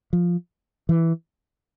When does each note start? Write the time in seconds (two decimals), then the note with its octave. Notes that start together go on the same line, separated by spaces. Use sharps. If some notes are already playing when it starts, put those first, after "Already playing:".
0.13 F3
0.89 E3